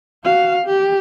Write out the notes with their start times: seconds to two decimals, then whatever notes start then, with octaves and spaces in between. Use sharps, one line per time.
0.24 F#4 F5
0.66 G4